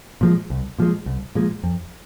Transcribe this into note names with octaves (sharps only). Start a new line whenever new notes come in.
A#2 F3 G#3
C2
A#2 F3 G#3
C2
A#2 F3 G#3
F2